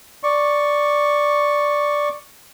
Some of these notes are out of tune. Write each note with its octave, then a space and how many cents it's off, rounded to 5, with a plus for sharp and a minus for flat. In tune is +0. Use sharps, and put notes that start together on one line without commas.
D5 +0 C#6 +0